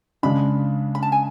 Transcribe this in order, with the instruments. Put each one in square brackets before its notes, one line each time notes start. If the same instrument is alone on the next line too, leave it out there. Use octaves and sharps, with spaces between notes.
[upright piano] C#3 G#3 D4 [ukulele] B5
[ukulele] B5
A5
G#5